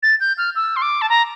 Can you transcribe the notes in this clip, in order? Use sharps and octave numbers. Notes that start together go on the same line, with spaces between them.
A6
G6
F6
E6
C6
D6
A5
A#5